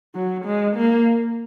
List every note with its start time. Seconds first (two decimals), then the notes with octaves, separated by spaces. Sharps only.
0.15 F#3
0.45 G#3
0.76 A#3